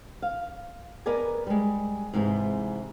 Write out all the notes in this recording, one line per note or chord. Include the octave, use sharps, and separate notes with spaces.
F5
B3 A#4 B4 D5 D#5 G#5
G3 G#3
G#2 C3 E3 G3 G#3